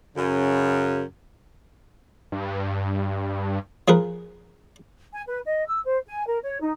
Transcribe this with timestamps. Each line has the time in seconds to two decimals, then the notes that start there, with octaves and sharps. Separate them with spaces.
0.16 F#2 C#3
2.32 G2
3.88 F3 G#4 A#4 B4
5.14 G#5
5.28 B4
5.46 D#5
5.68 E6
5.84 C5
6.07 G#5
6.27 A#4
6.42 C#5
6.61 D#4